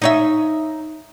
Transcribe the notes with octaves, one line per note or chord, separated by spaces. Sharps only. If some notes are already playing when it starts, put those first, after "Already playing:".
D#4 C#5 E5